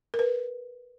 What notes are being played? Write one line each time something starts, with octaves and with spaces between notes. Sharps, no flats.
A#4
B4